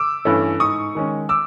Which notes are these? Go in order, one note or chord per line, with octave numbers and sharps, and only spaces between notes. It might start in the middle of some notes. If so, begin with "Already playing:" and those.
Already playing: D6 E6
G2 E3 A3 C#4
G#2 C#6 D#6
D#3 G#3 C#4
D6 E6